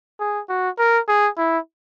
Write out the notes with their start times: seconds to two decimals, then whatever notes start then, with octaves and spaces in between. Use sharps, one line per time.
0.20 G#4
0.49 F#4
0.78 A#4
1.08 G#4
1.38 E4